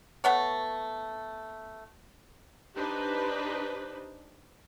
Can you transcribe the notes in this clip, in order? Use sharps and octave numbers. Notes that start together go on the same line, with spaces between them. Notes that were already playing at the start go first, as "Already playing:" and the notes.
A3 B3 C#5
D4 D#4 G4 B4 C5